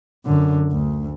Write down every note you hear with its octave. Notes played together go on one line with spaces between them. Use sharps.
F#2 D3
D2